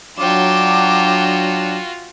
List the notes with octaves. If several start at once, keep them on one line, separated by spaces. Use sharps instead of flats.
F#3 D4 F4 F#4 G5 D6 E7